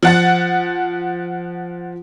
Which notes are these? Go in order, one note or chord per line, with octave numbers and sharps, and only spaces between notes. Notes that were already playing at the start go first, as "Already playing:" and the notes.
F3 F#5 A6